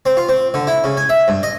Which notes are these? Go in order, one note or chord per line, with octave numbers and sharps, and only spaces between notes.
C4
F4
C4
D3
E4
C#3
G#5
E5
G2
D#5